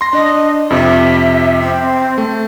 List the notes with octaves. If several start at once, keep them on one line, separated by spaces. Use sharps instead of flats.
C6 A#6
D4 D#5
F2 C3 E5
C4
A3